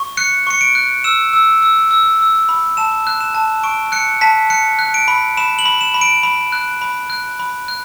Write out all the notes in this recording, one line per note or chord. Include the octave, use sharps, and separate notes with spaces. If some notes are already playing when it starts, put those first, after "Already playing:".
Already playing: C#6
F#6 C#7
C#6 C#7
D7
F#6
E6 E7
E6
E6
E6
E6
B5
A5 E7
F#6
E7
A5
C#6 D7
F#6 C#7
A5 B6
F#6 C#7
F#6
D7
B5
B5 E7
F#7
B5
E7
B5
D7
B5
F#6
B5
F#6
B5
F#6